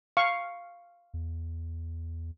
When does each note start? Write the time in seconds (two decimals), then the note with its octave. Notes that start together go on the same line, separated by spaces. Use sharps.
0.17 F5 C#6
1.14 E2